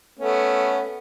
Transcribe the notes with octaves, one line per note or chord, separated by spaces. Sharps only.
A3 B3 C#4